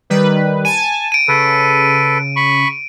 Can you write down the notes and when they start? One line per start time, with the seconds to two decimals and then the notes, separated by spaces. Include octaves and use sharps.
0.10 D#3 G3 B4
0.65 G#5 A5 D#7
1.12 D7 D#7
1.28 C#3 A4 B4
2.36 B5 C#6